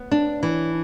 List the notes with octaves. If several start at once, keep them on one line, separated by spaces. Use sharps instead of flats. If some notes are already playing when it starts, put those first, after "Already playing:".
Already playing: B3
D4
E3